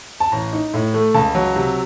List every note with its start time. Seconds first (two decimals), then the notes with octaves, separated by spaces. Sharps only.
0.20 A5
0.32 A1 A#5
0.53 D#4
0.74 A2
0.94 A3
1.14 C#2 A5
1.35 F#3
1.56 C3